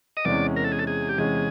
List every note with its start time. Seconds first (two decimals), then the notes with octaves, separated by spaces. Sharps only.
0.17 D#5
0.25 E2 C3 E3 G#3 C#4 D5
0.56 A#4
0.64 A4
0.72 G#4
0.79 A4
0.87 G#4
1.09 G4
1.18 E2 C3 E3 G#3 C#4 G#4